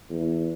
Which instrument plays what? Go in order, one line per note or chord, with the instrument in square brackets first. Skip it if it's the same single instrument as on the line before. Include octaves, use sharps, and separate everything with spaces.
[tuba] E2